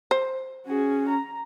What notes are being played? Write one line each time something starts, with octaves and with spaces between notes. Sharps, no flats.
C5
C#4 F#4 G#4
A#5